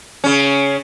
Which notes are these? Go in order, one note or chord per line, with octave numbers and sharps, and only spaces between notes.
C#3 C#4